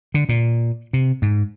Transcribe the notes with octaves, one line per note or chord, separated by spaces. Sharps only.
D3
A#2
C3
G#2